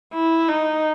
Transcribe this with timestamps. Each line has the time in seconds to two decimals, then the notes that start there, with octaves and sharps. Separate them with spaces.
0.14 E4
0.48 D#4